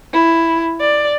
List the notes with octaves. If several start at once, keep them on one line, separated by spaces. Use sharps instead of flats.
E4
D5